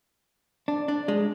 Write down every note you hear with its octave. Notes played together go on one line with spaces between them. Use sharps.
D4
D4
G#3